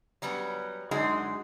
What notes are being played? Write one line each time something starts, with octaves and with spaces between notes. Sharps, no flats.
F#3 G3 B3 C#4
F#2 D3 G#3 D#4 F#4 G#4